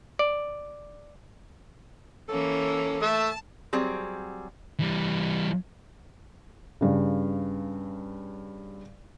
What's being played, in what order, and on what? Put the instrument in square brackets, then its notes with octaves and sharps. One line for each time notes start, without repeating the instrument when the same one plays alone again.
[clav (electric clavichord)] D5
[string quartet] E3 A#3 C#4 [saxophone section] A4
[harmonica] A3 E5 [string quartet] A5
[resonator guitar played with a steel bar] F#3 G3 C4 G#4
[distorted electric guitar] E3 G3
[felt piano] G2 C#3